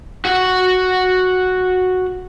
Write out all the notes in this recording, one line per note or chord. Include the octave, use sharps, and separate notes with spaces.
F#4 F#5